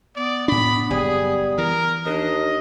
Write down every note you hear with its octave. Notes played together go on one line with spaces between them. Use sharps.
B3 D5
A2 D4 B5
F#1 G3 G#4
E3 A#4
D#2 D4 D#5